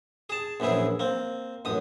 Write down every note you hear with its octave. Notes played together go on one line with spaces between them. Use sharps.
G#4 A5
A#1 F#2 E3 E4 G#4
A#3 C4
A1 F#2 D#6